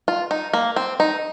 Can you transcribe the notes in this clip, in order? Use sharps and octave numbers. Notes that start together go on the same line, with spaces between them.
F4
D#4
A#3
C4
D#4